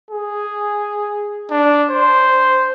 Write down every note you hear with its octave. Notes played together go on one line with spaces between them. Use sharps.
G#4
D4
C5